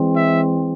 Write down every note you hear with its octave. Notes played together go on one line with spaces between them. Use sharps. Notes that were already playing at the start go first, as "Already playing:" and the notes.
Already playing: E3 G#3 C4
E5